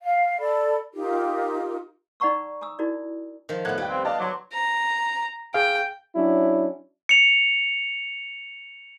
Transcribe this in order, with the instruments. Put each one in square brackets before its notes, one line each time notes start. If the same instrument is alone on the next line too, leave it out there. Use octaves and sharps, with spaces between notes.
[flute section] F5
A4 D5 B5
D#4 F4 G4 A#4
[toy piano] D#4 D5 F#5 A#5 C#6 E6
G#5 A#5 D#6 E6
D#4 E4 F#4 A#4 D5
[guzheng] D#3 F3
[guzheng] A2 B3 [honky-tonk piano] F#5 F#6 G#6
[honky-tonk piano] D#2 G5 [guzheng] G3
[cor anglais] C4
[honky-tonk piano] D5 D#5 A5 [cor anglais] F5
[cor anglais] F#3 [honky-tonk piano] A5 C6 D6
[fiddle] A#5
[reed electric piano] G#4 F5 [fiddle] G5
[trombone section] F#3 C#4 D4 E4
[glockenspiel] C#7 F7